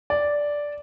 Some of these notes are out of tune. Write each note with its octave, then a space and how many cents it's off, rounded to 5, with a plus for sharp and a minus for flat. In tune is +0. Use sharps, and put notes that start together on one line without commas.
D5 -5